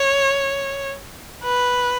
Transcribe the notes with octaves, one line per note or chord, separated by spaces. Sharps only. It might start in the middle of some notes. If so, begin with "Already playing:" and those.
Already playing: C#5
B4